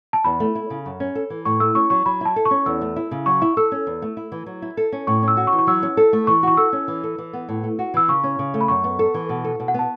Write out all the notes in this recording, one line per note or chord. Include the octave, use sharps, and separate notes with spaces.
A5
E2 B5
A3
E4
C#3
F#2
C#4
A4
E3
A2 C#6
A3 E6
C#4 C#6
F#3 C#6
F#3 B5
E4 A5
A4
C#6
C#4
E2 E6
A3
E4
C#3
F#3 C#6
E4
A4 E6
C#4
E2
A3
E4
E3
F#3
E4
A4
C#4
A2 C#6
C#4
E6
F#4
C#6
E3
C#6
F#3 E6
C#4
A4
A3
E3 C#6
F#4 C#6
A4 E6
C#4
E3
A4
E3
B3
A2
A3
F#4
E3 E6
C#3 C#6
C#4
C#3
A3
B5
F#2 C#6
B3
A4
E3
B2
A4
B2
F#5
B3 A5